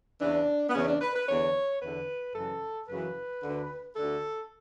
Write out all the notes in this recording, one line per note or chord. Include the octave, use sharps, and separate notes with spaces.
E2 C#3 E3 D4
B3
E2 C#3 E3 C#4
D4
B4
B4
E2 D3 C#5
E2 D3 B4
F#2 C#3 E3 A4
F#2 C#3 E3 B4
D2 D3
D2 D3 A4